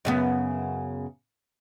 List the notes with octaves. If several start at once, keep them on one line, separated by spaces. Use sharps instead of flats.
F#2 C#3 B3